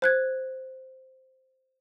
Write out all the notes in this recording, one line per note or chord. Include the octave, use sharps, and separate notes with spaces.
C5 F#6 G#6